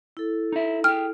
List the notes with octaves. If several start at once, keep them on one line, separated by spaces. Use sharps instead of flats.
E4 A4
D#4 E5
G#4 G5 F6